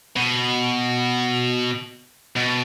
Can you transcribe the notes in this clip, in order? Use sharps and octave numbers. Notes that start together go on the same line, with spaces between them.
B2
B2